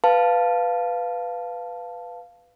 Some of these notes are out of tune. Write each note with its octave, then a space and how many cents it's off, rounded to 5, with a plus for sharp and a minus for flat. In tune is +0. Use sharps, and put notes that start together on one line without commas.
B4 +5 F5 +0 A5 +0